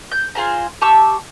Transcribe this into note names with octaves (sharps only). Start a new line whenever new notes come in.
G6
F4 G#4 C5 A#5
G4 A5 C#6 E6